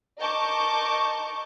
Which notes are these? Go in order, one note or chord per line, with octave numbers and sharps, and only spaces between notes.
A#4 D#5 A5 C#6 D6 G6